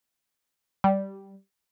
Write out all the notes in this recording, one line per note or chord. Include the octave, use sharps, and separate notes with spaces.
G3